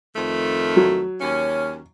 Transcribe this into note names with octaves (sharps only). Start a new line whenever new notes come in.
F2 D#3 A3
F#3
D#2 C#4